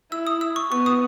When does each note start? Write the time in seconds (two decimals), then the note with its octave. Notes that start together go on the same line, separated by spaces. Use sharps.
0.12 E4 E6
0.27 D#6
0.41 E6
0.56 C#6
0.71 B3 C#6
0.86 D#6